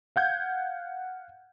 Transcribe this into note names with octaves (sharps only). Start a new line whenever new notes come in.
F5 F#5 G6 G#6